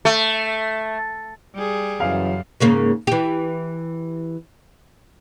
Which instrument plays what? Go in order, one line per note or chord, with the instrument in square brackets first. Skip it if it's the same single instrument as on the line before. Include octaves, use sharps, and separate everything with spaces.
[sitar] A3
[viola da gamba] G3 G#4
[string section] F#2 [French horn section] C#3 E3 F#3 [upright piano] F5
[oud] G#2 C#3 A#3
E3 G4